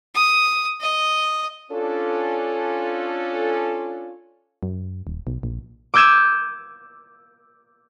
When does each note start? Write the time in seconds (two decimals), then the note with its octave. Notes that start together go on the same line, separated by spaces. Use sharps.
0.14 D#6
0.80 D#5
1.71 C#4 D4 F4 A4
4.63 F#2
5.07 D#1
5.27 B1
5.43 A#1
5.94 D6 E6 G6 G#6 D#7 E7